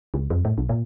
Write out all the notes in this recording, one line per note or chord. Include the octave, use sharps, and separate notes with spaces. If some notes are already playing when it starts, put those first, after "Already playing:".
C#2
F2
A2
B1
A#2